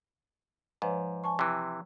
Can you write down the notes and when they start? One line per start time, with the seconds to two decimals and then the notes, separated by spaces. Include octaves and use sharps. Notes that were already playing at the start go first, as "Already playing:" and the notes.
0.82 G#2 F3 B4 C#5
1.24 G#5 A5 C#6
1.39 C3 E3